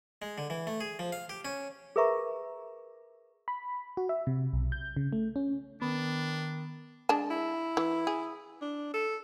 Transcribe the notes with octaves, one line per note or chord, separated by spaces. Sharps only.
G#3
D3
E3
A3
G#4
F3
F5
G4
C#4
G#4 A#4 B4 E5 A#5 C#6
B5
F#4
E5
C3
B1
G6
C#3
A3
C#4
D#3 B3 D4
G#3 D4 A5
E4
E3
G#4
D4
A4